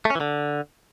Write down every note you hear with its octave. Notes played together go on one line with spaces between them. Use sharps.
A3
C#4
E3
D3